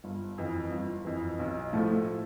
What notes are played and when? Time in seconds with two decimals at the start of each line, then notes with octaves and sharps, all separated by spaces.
0.04 G1
0.38 F2 E3
0.72 G1
1.05 F2 E3
1.39 B1
1.73 A2 F3 A3